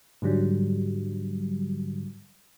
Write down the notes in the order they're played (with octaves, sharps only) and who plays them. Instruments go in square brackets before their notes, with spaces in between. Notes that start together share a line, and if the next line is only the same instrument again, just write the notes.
[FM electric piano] G#2 D3 F#3 G3